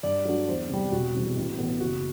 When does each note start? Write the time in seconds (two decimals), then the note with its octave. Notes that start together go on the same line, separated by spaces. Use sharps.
0.03 G2 D5
0.25 F#3 A3 D4 F#4
0.48 E2 C5
0.69 C3 G3
0.92 E1 F#4
1.14 E2 C3 G3
1.37 A1
1.58 A2 E3 B3
1.80 F#1 F#4